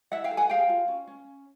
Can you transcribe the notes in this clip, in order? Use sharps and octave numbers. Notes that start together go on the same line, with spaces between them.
E4 E5 F#5
F5 G5
A4
F#5 G#5
G#4 F5 G5
F4
C#4
C#4